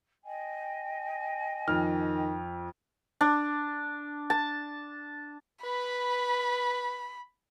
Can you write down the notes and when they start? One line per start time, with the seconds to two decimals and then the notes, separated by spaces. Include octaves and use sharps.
0.23 D#5 G5 G#5
1.68 F2 D#3 F6
3.21 D4
4.30 A5
5.64 B4 B5